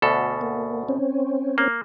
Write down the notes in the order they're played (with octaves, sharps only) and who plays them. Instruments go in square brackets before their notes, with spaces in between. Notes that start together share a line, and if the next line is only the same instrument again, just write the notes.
[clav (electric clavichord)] D2 B2 A4
[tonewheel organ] A#3
C4 C#4
[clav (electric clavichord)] A#3